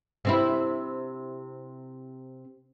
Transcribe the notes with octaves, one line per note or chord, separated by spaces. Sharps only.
C3 C4 E4